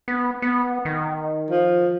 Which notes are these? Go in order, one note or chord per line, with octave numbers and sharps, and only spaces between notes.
B3
B3
D#3
F3